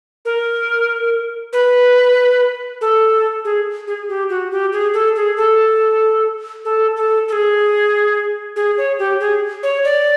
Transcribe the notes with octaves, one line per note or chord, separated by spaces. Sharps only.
A#4
B4
A4
G#4
G#4
G4
F#4
G4
G#4
A4
G#4
A4
A4
A4
A4
G#4
G#4
C#5
G4
G#4
C#5
D5